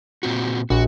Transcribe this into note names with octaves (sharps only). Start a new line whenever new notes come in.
A#2 C4 F#4
A#1 F#4